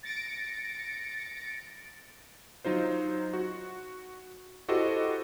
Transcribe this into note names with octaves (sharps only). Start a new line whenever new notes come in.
A6 A#6 C#7 D7
F#3 D#4 F4 C5
F#4
E4 F#4 G4 A4 C5 D#5